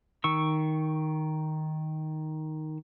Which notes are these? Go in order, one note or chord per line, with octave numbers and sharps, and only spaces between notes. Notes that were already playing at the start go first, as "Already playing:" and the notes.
D#3 C#6 E6